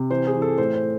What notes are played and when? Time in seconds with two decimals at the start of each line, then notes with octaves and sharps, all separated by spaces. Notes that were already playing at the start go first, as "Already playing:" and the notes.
Already playing: C3
0.10 E3 C5
0.27 G#4
0.34 E3
0.42 A4
0.58 A2 C5
0.75 C5
0.83 A2